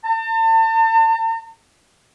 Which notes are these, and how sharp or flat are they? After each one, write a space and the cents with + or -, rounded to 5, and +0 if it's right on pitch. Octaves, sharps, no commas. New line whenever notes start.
A5 +40